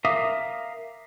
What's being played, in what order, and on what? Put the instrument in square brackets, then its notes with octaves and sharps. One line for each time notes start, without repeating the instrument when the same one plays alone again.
[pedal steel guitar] A#4 E5 F5 D6 D#6